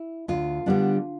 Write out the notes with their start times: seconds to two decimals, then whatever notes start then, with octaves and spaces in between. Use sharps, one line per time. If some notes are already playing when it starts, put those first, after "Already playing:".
Already playing: E4
0.28 D2 F4
0.66 D3 G3 B3 D4